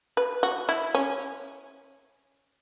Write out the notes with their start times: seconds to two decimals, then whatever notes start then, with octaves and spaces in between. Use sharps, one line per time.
0.17 B4
0.43 F#4
0.69 E4
0.95 C#4